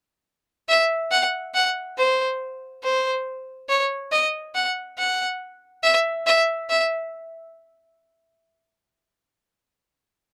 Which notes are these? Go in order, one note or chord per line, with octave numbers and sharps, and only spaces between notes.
E5
F#5
F#5
C5
C5
C#5
D#5
F#5
F#5
E5
E5
E5